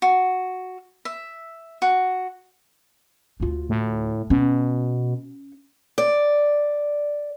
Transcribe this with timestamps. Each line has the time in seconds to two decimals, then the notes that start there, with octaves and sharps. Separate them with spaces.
0.02 F#4
1.05 E5
1.82 F#4
3.40 D2 F4
3.69 A2
4.30 B2 C#4
5.98 D5